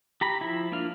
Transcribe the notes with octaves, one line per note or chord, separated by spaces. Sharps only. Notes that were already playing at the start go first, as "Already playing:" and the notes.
G4 A#5 B5
F3 E4
A#3 D4 F4 F6